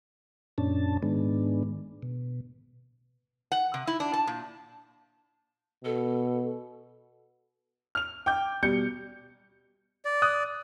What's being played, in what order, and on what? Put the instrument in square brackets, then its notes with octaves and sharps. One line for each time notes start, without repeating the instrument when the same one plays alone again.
[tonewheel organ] F#2 A#2 C#4 D4 A5
G#2 D#3 G#3 B3 D4
B2
[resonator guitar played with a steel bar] F#5
C3
E4
D4
A5
A#2
[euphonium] B2 [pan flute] A4
[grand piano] F6 F7
G5 D6 G6
B2 G3 G6 C#7
[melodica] D5
[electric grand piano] D#6 F#6